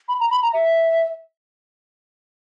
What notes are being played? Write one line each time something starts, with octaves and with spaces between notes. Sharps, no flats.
B5
A#5
B5
A#5
E5